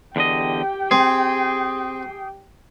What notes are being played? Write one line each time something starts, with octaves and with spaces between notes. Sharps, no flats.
E2 D3 G4 D#5 G5
C4 G#4